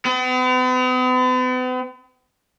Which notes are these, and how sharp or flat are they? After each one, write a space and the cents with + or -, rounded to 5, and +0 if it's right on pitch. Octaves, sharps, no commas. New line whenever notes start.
B3 +45